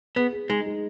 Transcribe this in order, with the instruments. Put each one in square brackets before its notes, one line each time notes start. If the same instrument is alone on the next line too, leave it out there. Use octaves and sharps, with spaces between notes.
[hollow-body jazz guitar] B3 [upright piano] G#4
[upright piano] G#4
[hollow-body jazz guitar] G#3 [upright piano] D#4
[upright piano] G#3